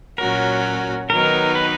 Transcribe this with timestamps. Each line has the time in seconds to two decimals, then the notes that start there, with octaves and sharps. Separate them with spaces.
0.18 A#2 F#3 C#4 F#4 A#4
1.10 D#3 F#3 B3 D#4 A#4
1.55 B4